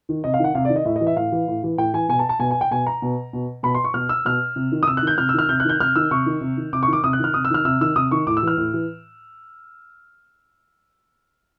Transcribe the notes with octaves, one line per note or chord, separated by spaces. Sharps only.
D#3
C3 D#5
F5
D#3 F#5
C3 F5
D5
D#3
D#5
A2 E5
D#5
E3
E5
A2 F5
E3
A2
E3
A2 G5
E3 G#5
B2 G#5
A5
A5
B2 G#5
G#5
G5
B2 G#5
A#5
B2
B2
B2 B5
C6
C#6
B2 F6
E6
B2 F6
C3
D#3
D#6
C3 E6
F#6
D#3 G6
C3 F6
E6
D#3 F6
C3 G6
F#6
D#3 G6
C3 F6
D#3 E6
C3 C#6
D#3
C3
D#3
C3 D6
C#6
D#3
D6
C3 D#6
F#6
D#3 F6
C3 D#6
E6
D#3 F6
C3 E6
D#3 E6
C3 D#6
D#3 C#6
A2 D6
E6
E3 F6
A2
E3